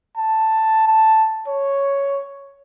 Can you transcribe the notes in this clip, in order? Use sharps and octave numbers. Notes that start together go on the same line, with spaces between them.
A5
A5
C#5